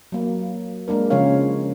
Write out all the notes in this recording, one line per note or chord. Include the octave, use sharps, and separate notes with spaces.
F#3 A#3
G#3 A#3 D4 A#4
C#3 F3 G#3 C#4 C#5 F5